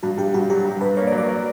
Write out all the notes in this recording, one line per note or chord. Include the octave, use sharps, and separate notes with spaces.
G2 F#4
G2 G4
G2 F#4
F#3 G4
G2
G2 B4
A#3 C#5
D5
F#3
D5
F#3